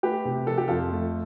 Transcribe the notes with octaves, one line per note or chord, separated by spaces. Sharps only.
A3 G4 B4
C3
F3 A4
G4
F2 F4 A4
A3